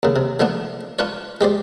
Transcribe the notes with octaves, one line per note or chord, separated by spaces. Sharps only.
D#2 C#3
C3
D3 F3 A3 B3 D4
D4 F4 B4 C#5
G#3 G4 C5 D5